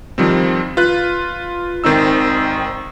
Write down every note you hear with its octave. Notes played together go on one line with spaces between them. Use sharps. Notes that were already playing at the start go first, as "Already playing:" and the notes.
D#3 F3 G3 C4
F4 B4 F#6
G#1 D#3 C4 D#4 E6